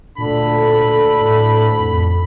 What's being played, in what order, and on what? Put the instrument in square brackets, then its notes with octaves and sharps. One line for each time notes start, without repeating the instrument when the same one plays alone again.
[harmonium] D2 D3 D4 [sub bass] A#2 [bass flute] A4 [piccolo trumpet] B5
[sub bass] A2
F2